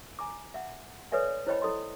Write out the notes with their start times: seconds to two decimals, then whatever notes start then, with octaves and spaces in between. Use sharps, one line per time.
0.19 G#5 A#5 D6
0.54 E5 F#5
1.12 A4 B4 C#5 D5 E5 G#5
1.47 E4 C5 C#5 D#5 G5 B5
1.62 E4 A4 D#5 C6